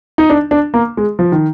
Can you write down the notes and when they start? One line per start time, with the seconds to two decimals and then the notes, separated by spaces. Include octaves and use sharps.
0.18 D#4
0.30 D4
0.51 D4
0.74 A#3
0.97 G#3
1.19 F3
1.32 D#3